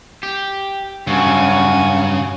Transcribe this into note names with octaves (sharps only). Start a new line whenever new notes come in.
G4
G2 C#3 F#3 F#4 G#5